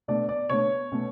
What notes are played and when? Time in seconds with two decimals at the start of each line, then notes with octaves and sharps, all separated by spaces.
0.08 B2 A3 D4 D5
0.29 D5
0.49 B2 A3 D4 C#5
0.92 B2 A3 C#4